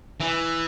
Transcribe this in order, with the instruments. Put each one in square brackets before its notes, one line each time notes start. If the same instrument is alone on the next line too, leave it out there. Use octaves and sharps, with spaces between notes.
[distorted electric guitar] E3